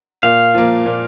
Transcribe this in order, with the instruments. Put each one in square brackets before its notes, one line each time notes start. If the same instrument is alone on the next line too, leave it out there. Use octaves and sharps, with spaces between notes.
[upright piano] A#2 [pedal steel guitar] F5
[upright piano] F3 A#3
A#2